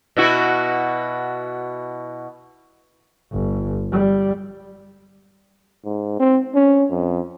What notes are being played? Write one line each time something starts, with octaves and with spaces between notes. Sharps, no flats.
B2 E4 F#4
G1
G3
G#2
C4
C#4
F2